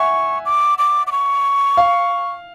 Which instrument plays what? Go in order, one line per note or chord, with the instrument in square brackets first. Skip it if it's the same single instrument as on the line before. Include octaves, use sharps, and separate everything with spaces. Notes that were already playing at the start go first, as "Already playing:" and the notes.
Already playing: [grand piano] E5 F#5 G#5 [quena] C#6
[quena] D6
D6
D6
C#6
[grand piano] F5